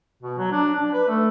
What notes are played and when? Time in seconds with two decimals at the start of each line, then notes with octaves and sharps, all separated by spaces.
0.23 B2
0.38 F#3
0.52 D4
0.75 D4
0.93 B4
1.08 A3